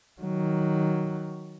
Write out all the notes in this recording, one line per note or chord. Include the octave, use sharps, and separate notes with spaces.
D#3 F#3